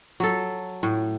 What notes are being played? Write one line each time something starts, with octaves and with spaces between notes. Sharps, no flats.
F#3 A4
A2